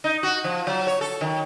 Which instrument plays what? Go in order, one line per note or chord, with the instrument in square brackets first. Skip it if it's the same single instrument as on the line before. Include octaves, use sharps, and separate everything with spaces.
[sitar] D#4
F#4
F3
F#3
C#5
A4
D#3